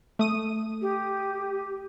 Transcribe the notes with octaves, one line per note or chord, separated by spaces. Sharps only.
A3 D#6 D#7
G4